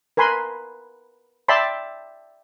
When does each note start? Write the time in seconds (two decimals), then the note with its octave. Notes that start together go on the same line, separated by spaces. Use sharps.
0.17 A#4 B4 G#5 B5 C6
1.48 D5 E5 G5 A5 B5 C6